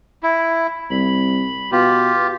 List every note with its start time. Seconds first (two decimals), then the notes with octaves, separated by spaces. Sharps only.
0.23 E4
0.90 C2 B5
1.72 B2 F4 G4